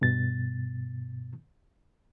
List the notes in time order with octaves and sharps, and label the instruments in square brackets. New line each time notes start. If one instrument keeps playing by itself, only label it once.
[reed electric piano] G2 B2 A6